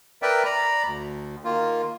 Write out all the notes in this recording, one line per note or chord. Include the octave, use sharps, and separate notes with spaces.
A#4 B4 D5 E5 G5
D5 A#5 B5
D2
D#3 A#3 F4